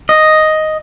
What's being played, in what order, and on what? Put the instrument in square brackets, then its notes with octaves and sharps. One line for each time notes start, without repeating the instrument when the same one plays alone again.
[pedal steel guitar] D#5